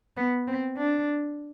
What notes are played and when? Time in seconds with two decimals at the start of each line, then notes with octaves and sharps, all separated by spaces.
0.17 B3
0.47 C4
0.77 D4